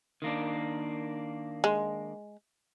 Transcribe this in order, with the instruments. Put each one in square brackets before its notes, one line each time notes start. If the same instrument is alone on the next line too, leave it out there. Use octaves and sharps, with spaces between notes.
[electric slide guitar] D#3 A#3 D4
[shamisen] G#3